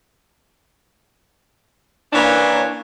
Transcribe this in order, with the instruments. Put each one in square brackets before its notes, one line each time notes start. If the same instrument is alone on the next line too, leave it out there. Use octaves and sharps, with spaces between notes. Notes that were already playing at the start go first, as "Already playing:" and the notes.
[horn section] E3 A#3 C#4 D4 C5 C#5